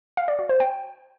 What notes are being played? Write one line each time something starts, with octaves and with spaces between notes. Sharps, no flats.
F5
D5
F#4
C5
G5